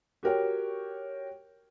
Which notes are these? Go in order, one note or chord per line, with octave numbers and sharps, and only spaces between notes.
F#4 G4 A#4 C#5 G5